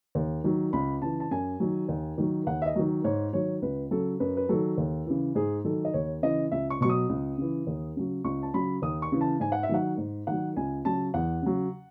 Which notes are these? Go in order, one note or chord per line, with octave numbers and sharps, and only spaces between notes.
D#2
D#3 F#3
C#2 B5
C#3 E3 A5
A5
F#2 G#5
D#3 F#3
D#2
D#3 F#3
D#2 F#5
E5
D#5
D#3 F#3
G#2 C#5
D#3 F#3 C#5
C#2 B4
C#3 F#3 A4
F#2 B4
B4
D#3 F#3 A4
D#2
C#3 E3
G#2 G#4
D#3 F#3 A4
D#5
D#2 C#5
C#3 E3 D#5
C#2 E5
C#6
B2 F#3 C#6
D#6
C#2
C#3 E3
D#2
C#3 F#3
C#2 C#6
A5
C#3 F#3 B5
D#2 D#6
C#6
C#3 E3
A5
G#2 G#5
F#5
E5
D#3 F#3 F#5
G#2
D#3 F#3 F#5
C#2 G#5
C#3 F#3 A5
E2 F#5
C#3 F#3